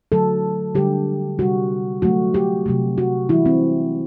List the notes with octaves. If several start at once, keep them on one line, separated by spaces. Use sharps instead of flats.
D3 F#3 A3 A4
D3 G3 G4
C3 G3 F#4
D3 F#3 A3 F#4
G4
C3 F#3 A3
F#4
C3 E3 G3 E4
C4